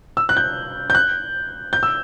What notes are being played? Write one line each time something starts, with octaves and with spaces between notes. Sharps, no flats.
E6
F#6
G6
G6
F#6
G6
E6